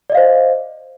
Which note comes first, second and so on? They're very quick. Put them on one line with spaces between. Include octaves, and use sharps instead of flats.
D5 D#5 F5 C5